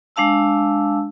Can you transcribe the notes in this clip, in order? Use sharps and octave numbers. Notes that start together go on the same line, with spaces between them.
G#3 D4 F5 A5 E6